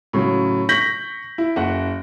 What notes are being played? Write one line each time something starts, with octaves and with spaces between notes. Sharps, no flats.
A2 C#3 F#3
C#6 G6 A#6 B6 F#7
E4
F#1 F#5